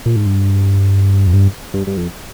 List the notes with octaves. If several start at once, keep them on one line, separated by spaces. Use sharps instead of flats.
A#2
G#2
G2
F2
G2
G2
G2
F2